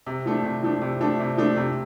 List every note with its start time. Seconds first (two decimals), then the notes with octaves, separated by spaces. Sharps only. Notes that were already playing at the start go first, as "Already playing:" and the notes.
0.06 C3
0.25 F3 A3 D4
0.44 C3
0.63 F3 A3 D4
0.81 C3
1.00 F3 A3 D4
1.20 C3
1.37 F3 A3 D4
1.57 C3